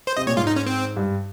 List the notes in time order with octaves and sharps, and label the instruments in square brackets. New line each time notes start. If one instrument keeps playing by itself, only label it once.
[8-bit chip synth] C5
[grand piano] C3 [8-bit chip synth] D#5
[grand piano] A#2 [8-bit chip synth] C#5
[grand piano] G#2 [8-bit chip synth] F4
[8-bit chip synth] D#4
C#4
C4
[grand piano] G2